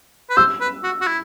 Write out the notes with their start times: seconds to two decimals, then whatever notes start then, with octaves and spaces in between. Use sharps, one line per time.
0.30 B4
0.37 C5 E6
0.61 B4
0.83 F#4
1.01 F#4
1.07 E4